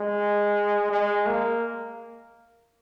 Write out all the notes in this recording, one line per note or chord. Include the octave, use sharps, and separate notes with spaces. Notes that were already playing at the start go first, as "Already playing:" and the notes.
Already playing: G#3
G#3
A#3